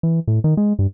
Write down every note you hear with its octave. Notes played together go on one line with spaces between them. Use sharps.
E3
A2
D#3
G#3
G2